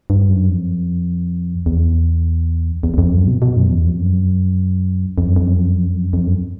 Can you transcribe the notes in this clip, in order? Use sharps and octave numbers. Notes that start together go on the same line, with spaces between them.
G2
F#2
F2
E2
E2
E2
F2
F#2
B2
B2
F#2
F2
E2
F2
F#2
F2
F#2
F2
F#2
F2
F#2
F2
F#2
F2
F#2
F2
F#2